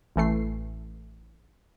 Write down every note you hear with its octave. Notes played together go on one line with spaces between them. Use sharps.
A1 E3 A3 C7